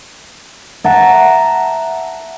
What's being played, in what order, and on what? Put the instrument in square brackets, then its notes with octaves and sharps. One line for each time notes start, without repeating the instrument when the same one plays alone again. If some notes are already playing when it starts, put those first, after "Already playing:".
[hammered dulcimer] E5 F#5 A5 A#5